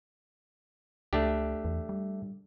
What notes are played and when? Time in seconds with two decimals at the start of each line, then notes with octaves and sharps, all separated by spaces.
1.13 C#2 A3 D4 G4
1.65 E2
1.89 G3